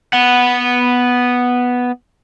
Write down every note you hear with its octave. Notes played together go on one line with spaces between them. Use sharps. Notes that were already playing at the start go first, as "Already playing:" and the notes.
B3 F#5